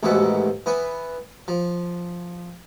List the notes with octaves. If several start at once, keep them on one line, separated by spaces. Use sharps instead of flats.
A1 D#2 G#2 B2 E5 F#5
E3 B3 B4
F3